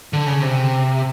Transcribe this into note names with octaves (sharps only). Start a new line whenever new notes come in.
D3
C#3
C3